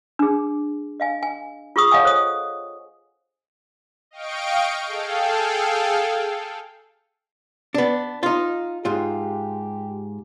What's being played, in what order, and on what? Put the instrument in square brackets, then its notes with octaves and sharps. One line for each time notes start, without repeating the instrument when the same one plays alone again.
[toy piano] D4 G#4
D#5 F5 G#5
G#5
F4 G#4 C#6 D#6
C#5 D#5 F5 F#5 G#5 D#6
A4 C5 D#6
[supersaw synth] D#5 F5 G5 C#6 D7
G#4 A4 F5 G5
[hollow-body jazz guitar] B3 D4
D#4 F4
[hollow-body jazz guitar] G#2 F4 [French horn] G4